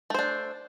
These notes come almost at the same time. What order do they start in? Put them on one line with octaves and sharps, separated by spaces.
A3 C5 D4